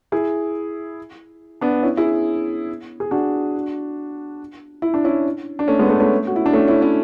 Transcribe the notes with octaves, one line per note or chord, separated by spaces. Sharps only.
E4 G#4
B3 D4
C#4 E4
E4 G#4
G#4
D4 F#4
E4
D4
C#4 E4
D4
A3 C#4
G#3 B3
A3 C#4
A3 C#4
F#4
E4
D4
A3 C#4
C#4 E4
C#4 E4